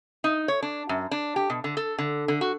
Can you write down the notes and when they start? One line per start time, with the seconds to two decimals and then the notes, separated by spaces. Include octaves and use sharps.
0.24 D#4
0.48 C#5
0.62 D4
0.89 F#2
1.11 D4
1.36 G4
1.50 B2
1.64 D3
1.77 A4
1.98 D3
2.28 D3
2.41 F#4